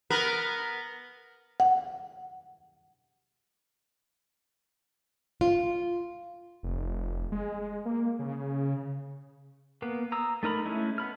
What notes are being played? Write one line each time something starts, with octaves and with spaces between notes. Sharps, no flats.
B3 A#4 B4
F#5
F4
F1
G#3
G#3
A#3
C#3
A#3 B3
A#5 D#6 E6
A3 D#4 A#4 B5
G#3 A3 C#4 E4
B3 B5 F6